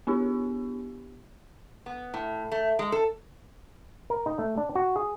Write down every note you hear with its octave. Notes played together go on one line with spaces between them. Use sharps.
B3 D4 E4 G4
B3
A2
A3
G#3
A4
A#4
D#4
A3
D4
F#4
G#4